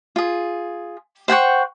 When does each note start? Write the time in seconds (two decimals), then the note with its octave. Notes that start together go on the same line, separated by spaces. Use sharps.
0.16 F4 G#4
1.28 C5 F#5 G5 C#6